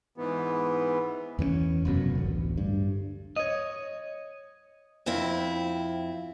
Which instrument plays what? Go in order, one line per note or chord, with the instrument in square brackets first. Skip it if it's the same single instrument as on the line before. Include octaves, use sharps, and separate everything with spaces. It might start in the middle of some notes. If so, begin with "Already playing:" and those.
[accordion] G#2 E3 B3
[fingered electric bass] E2 E3 A#3 C#4
F1 F#2 B2
A1 D2
G2
[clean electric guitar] C#5 D#5
[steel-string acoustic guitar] F2 C4 E4